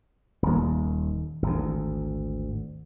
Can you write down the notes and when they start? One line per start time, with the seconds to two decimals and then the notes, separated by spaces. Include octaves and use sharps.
0.43 D#1 D#2
1.42 G#1 D2